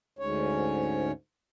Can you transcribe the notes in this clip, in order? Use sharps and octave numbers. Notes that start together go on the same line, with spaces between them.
D2 G#2 C#4 C#5